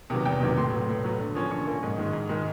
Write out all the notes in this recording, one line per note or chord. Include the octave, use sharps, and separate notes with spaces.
C3 D#3 F#3 B3
E2 G5
C3 D#3 F#3 B3
A2 C6
F#3 B3
A2
F#3 B3
D3
F3 A#3 C#4
D3 C#6
F3 A#3 C#4
G#2
D#3 G#3
G#2
D#3 G#3